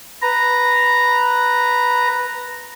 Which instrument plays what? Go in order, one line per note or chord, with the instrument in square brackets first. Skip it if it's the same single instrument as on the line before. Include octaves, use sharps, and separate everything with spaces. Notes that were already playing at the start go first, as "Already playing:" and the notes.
[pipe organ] B4 A#5